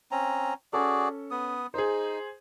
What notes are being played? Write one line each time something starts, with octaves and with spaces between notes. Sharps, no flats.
C4 C#4 A#5
C#4 F#4 G#4 A4 D5
B3 D#6
D#4 G#4 C5